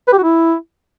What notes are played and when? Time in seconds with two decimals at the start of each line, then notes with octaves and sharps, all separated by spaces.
0.08 B4
0.13 G4
0.18 F#4
0.23 E4